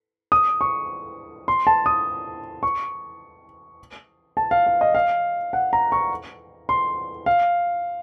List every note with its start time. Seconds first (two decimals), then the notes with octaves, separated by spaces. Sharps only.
0.32 D#6
0.61 C#6
1.48 C6
1.67 A5
1.86 D#6
2.63 C#6
4.37 A5
4.51 F5
4.67 F5
4.81 D#5
4.95 F5
5.53 F#5
5.73 A#5
5.92 C#6
6.69 C6
7.26 F5